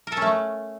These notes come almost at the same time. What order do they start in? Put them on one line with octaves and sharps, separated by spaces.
A#4 A4 C#4 A3